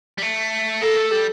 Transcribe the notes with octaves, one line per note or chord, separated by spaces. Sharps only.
G3
A3
A#3 A4
A3
G3